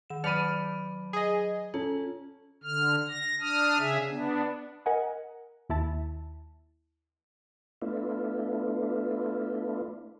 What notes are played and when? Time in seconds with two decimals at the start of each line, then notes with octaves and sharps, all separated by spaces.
0.10 D#3 E7
0.24 F#3 D5 B5 F6 C#7 D#7
1.13 G#4 D#5
1.74 C#4 F4 A4
2.63 D3 F6
3.09 A#6
3.41 D4 D#6 F6
3.79 C#3 G#4 E5
4.09 B3 D4
4.86 A#4 D#5 F#5 G#5
5.69 D#2 E4 A5
7.82 A3 B3 D4 E4 F4